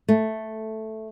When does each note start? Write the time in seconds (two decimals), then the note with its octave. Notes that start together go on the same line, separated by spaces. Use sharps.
0.08 A3